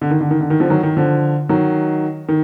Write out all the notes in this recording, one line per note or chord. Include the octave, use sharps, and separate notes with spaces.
D3
D#3
D3
D#3
D3
D#3
D3 F3
D#3 F#3
D#3
D3 F3
D#3 F#3
D#3